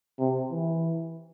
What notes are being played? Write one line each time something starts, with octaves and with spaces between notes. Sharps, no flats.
C3
E3